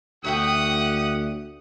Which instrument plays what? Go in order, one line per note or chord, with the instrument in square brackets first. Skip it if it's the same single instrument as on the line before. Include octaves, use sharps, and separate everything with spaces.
[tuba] D2 [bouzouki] F#4 E5 G5 [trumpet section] G4 F#5 D#6